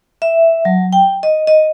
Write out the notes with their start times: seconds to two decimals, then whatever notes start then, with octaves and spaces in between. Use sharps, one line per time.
0.22 E5
0.65 F#3
0.93 G5
1.23 D#5
1.47 D#5